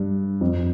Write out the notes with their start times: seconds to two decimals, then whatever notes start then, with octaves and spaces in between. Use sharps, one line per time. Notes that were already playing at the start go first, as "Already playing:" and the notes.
Already playing: G2
0.41 F2